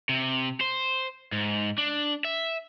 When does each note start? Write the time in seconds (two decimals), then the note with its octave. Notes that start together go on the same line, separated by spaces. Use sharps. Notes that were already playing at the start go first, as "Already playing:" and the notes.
0.09 C3
0.61 C5
1.32 G#2
1.78 D4
2.25 E5